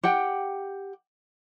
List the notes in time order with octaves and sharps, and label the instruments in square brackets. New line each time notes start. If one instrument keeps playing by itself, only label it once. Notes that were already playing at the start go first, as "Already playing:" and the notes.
[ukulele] G4 F#5 G5